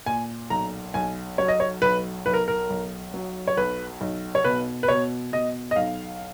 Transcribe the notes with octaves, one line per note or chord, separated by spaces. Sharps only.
A#2 G#5
B1 A#5
B1 G#5
F#3 C#5
D#5
C#5
B1 B4
B1 B4
A#4
A#4
B1
F#3
C#5
B1 B4
B1
C#5
B2 B4
B4
B2 C#5
B2 D#5
D#5
B1 F5